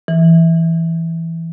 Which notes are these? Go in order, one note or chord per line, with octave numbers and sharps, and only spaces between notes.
E3